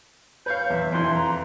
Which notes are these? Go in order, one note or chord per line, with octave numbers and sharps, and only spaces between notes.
B4 C#5 F5 G6
E2 E5
F2 E3 C6
A#5